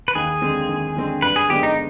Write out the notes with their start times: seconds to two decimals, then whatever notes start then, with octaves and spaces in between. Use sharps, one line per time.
0.08 B4
0.15 D#2 G#4
0.42 D3 G#3 C4
0.69 D#2
0.96 D3 G#3 C4
1.22 G2 B4
1.36 G#4
1.49 D3 G#3 B3 D4 G4
1.63 D#4